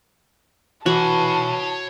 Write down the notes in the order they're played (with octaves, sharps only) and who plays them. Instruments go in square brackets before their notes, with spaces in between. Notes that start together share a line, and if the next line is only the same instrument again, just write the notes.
[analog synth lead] E3 [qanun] F#4 [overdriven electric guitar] C#5 B5 [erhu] A5